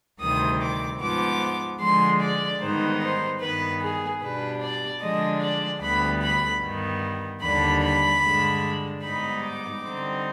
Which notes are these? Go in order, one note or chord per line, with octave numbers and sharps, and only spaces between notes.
D2 C3 D#3 G3 C4 D#6
D6
G#2 F3 B3 D6
D3 F3 G#3 C6
D5
G#2 D#3 G3 B3 D#4 C5
C5
G2 D#3 B3 B4
G#4
B2 G3 D4 B4
D5
D3 F3 G#3 D4 D#5
D5
D2 D3 G3 B3 B5
B5
G2 D#3 B3
D#2 D3 G3 D4 B5
B5
G2 D3 G#3 D4
G#2 G3 B3 D#4 B5
D6
D3 G3 C4 D#4